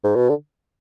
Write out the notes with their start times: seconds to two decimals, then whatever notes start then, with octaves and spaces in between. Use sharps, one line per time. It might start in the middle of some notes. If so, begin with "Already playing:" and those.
0.04 G#2
0.16 B2
0.29 D3